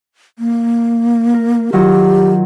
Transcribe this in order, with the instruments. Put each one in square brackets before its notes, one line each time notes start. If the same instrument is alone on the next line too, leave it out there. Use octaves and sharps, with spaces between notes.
[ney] A#3
[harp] A#4
[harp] D#3 F#3 F4 [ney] G4